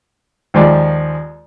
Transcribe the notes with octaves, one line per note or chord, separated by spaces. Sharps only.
D#2 F3 G#3 D5